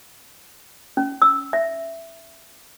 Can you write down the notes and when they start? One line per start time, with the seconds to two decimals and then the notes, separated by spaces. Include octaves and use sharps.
0.97 C#4
1.22 E6
1.53 E5